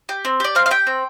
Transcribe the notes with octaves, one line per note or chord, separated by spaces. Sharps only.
G4
C4
G4 D5
C4 F5
F5
G4 G5
C4